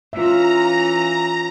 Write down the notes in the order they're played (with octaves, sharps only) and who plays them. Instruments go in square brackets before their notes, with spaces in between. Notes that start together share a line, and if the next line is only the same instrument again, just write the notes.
[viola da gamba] E3 C#4 [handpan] F4 E5 [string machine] A#5